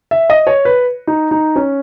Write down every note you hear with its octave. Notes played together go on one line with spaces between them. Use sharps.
E5
D#5
C#5
B4
D#4
D#4
C#4